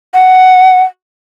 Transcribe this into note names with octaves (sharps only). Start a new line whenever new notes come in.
F#5